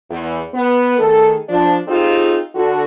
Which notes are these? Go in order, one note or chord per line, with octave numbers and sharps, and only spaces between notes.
E2
B3
D#3 A3 G#4 A4
F3 D4
C4 D#4 F4 G4 G#4
D3 F#4